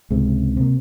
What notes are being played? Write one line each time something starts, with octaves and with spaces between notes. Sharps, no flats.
C#2 G#2 C3
C3 A#3